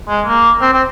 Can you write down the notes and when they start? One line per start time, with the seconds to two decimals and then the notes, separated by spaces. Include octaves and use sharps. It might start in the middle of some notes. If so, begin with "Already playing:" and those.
0.09 G#3
0.27 A#3
0.62 C4
0.73 C4